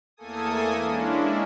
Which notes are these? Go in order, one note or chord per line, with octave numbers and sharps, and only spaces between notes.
E2 A3 A#3 A4 G#5 D#6
G#3 A#3 C#4 D4 E4